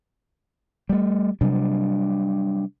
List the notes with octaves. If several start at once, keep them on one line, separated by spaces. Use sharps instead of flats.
G3 A3
C3 F#3 G3 D4